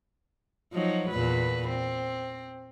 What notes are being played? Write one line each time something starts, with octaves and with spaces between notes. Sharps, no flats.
F3 F#3 D#4
E2 A#2 B4
C4